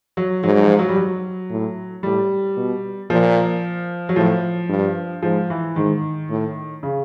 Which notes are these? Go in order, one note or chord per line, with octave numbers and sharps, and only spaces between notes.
F#3
G#2 F#3
F3
F#3
G3
F#3
A2
A2 G3
B2
A#2 F3
F#3
A2 F3
G2
G#2 F3
E3
G#2 D#3
A2
C#3